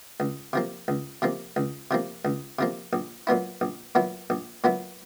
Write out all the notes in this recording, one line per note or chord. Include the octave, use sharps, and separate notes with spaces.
C#2
C3 F3 A#3
C#2
C3 F3 A#3
C#2
C3 F3 A#3
C#2
C3 F3 A#3
A#1
A#2 F#3 B3 E4
A#1
A#2 F#3 B3 E4
A#1
A#2 F#3 B3 E4